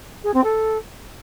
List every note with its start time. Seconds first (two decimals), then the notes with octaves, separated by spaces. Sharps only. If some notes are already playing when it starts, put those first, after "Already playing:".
0.24 G#4
0.34 C4
0.44 A4